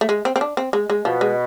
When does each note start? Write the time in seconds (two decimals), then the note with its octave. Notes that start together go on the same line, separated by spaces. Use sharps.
0.01 A3
0.09 G#3
0.25 C4
0.36 C4
0.41 D4
0.57 C4
0.73 G#3
0.90 G#3
1.05 B2 F3
1.21 G#3